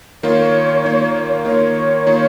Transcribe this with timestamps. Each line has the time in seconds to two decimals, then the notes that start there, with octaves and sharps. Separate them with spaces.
0.23 D#3 A#3 F4 C#5
0.84 D#3 A#3 F4
1.45 D#3 A#3 F4 C#5
2.07 D#3 A#3 F4